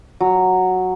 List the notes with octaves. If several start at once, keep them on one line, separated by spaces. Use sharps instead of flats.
F#3